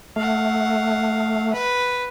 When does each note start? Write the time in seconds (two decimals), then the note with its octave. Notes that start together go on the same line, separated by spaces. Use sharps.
0.16 A3 F5 F#5
1.53 B4